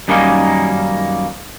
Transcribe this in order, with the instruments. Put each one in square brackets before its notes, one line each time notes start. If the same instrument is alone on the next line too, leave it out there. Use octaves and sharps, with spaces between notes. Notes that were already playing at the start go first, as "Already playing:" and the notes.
[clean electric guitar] F#2 D#3 G3 A#3 C#4 D#4